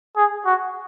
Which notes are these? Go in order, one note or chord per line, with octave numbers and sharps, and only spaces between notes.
G#4
F#4